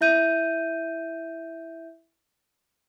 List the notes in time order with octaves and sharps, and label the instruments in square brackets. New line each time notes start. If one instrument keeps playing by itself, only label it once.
[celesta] E4 E5 G6 D#7